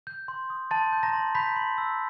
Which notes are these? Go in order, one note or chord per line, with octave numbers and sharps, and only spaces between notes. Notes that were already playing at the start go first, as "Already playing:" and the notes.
G6
C6
D#6
A5 C6 A6
G6
A#5 A#6
C6
B5 G6 B6
C6
E6